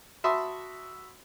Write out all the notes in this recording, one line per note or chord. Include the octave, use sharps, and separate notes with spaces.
F#4 E5 A5 B5 C6 D#6